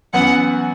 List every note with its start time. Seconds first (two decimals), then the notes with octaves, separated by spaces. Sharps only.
0.13 F#2 E3 B3 F#5